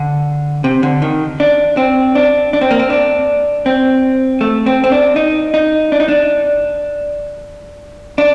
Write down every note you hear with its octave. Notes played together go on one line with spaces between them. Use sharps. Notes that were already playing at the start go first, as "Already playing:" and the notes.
Already playing: D3
C3
D3
D#3
D4
C4
D4
D4
C4
A#3
C4
D4
C4
A3
C4
C4
D4
D#4
D#4
D4
D#4
D4
D4